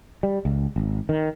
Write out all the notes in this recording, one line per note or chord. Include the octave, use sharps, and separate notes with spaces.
G3
C#2
G#1
D#3